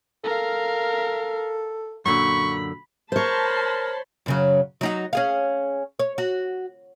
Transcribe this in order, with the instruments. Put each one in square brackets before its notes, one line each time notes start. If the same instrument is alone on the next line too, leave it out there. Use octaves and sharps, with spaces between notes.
[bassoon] A4 [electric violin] A#4 F5
[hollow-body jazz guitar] F#2 A#2 D3 [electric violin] B5 [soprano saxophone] C#6
[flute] A#4 [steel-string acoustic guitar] C5 C#5 [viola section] A5 B5 C6
[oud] F#2 C#3 F#3
F#3 D#4 F#4
C#4 G#4 F5
C#5
F#4